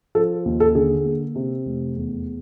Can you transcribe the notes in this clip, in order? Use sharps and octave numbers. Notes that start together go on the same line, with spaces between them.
F3 A4
D#2
A4
D3 G#4
A#3
C3
F1
E2